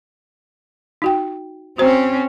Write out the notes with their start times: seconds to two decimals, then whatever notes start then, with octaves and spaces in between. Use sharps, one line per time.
1.02 D#4 F#4 G5
1.78 C4 C#4 F#4 C5 A#5